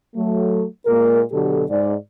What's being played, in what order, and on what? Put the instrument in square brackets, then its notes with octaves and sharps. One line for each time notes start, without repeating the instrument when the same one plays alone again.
[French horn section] F#3 A3
A#2 G#3 A#3 A#4
B2 D3 F#3 G4 A4
G#2 D5